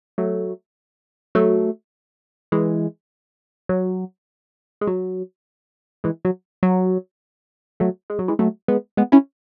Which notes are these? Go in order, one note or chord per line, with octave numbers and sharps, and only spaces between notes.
F#3 A3
F#3 A3
E3 G#3
F#3
G#3
F#3
E3 G#3
F#3
F#3
F#3 A3
G#3
F#3
E3 G#3
F#3 A3
G#3 B3
G#3 B3
C#4 E4